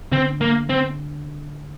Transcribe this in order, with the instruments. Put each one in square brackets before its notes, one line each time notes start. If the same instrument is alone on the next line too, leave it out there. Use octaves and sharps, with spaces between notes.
[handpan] D3 [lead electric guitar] C4
[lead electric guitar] A#3
C4